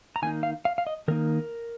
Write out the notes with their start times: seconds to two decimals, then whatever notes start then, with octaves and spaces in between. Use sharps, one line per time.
0.16 A#5
0.22 D#3 A#3 D#4 G#5
0.43 F5
0.65 F5
0.78 F5
0.87 D#5
1.08 D#3 A#3 D#4 A#4